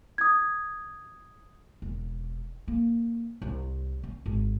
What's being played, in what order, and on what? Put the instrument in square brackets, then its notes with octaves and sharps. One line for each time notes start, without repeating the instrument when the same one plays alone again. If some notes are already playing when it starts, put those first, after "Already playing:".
[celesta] D#6 G#6
[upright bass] E1
A#3
C2
C#4
G#1